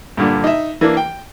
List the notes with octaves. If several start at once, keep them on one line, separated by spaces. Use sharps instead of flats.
G2 A#2 D3
D#4 E5
E3 A#3 D4
G5